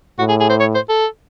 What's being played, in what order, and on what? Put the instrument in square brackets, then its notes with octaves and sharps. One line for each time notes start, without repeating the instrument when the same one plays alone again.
[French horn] A2 [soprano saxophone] F#4
[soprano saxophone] G#4
G#4
C5
C#5
C5
A4